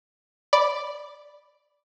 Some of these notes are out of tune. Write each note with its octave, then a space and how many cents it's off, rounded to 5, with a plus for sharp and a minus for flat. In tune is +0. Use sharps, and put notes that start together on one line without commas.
D5 +0 B5 +0